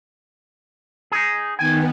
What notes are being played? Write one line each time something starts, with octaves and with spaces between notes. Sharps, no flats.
D#4 G#4
D#3 B3 G5 G#5